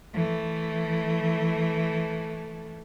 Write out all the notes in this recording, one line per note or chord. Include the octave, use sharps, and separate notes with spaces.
E3 A3